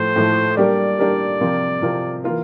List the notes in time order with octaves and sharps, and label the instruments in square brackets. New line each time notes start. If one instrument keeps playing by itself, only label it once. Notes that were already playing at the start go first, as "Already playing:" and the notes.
Already playing: [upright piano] A2 F3 A3 [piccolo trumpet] C5
[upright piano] A2 F3 A3
[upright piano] G3 A#3 D4 G4 A#4 [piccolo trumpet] D5
[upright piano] G3 A#3 D4 G4 A#4
C3 F3 C4 F4 A#4
C3 F3 C4 F4 A#4
E3 A#3 F4 A#4